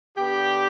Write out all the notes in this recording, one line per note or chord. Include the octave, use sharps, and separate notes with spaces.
D3 B3 D4 G4